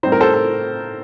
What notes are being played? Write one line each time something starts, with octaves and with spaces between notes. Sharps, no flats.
A2 G3 C4 D#4 C5
A#4
A4 C5
A4